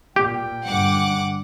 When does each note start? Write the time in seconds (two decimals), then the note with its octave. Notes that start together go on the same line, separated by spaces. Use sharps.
0.16 A#2 G4 G5
0.67 G2 D3 F#5 D6